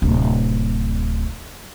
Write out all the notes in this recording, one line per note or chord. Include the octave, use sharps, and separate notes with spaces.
D1 C3